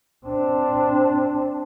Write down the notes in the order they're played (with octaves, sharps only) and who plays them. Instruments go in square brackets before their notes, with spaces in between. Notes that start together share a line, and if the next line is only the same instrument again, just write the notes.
[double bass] C4 D4